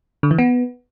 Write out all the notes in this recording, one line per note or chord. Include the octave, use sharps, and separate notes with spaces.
D3
E3
B3